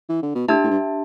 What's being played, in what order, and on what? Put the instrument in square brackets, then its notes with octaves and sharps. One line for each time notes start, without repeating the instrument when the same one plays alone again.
[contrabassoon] E3
D3
B2
[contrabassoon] A2 [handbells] D4 G4 E5 A5
[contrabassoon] A2
G2